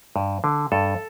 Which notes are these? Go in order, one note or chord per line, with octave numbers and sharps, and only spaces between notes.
G2
D3
G2 A4